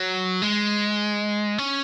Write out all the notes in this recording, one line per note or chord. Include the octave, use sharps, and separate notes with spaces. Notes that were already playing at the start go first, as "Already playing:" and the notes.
Already playing: F#3
G#3
C#4